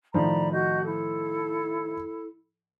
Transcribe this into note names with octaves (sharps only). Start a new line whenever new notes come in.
A2 D#3 F3 D5 A#5 B5
F#4 D#5 G6
E4 A4